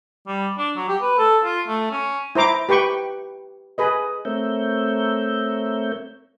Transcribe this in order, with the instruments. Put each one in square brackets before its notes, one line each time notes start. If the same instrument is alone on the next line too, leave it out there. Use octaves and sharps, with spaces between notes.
[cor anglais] G3
D4
F#3
G4
B4
A4
F4
A3
C#4
[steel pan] E4 C5 A#5 D6
G4 B4 G5 C#6
G#4 B4 D#5
[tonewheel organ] A3 C4 A#4 C#5 E5 G6